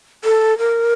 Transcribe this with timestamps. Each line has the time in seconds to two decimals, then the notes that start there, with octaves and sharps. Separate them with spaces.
0.24 A4
0.58 A#4